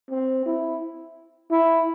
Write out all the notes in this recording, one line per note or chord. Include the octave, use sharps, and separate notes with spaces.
C4
E4
E4